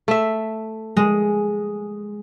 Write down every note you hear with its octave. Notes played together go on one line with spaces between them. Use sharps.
A3 E5
G#3